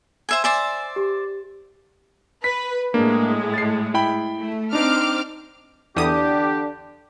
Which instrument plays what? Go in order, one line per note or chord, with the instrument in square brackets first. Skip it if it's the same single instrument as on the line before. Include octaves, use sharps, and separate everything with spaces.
[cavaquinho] C5 E5 G#5
[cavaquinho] C5 D5 E5 [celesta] G#5
[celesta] G4
[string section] B4 [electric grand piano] B6
[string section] A2 G#3 [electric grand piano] A#3 D4
[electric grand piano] A6 C7
E4 G5 B5
[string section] A3
[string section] C4 D6 F6 [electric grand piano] D4 D#4
[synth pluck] E2 D#6 [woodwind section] D3 G4 [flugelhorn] D4